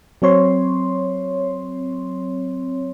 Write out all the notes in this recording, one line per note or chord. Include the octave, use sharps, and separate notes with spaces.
F#3 C4 C#5 C6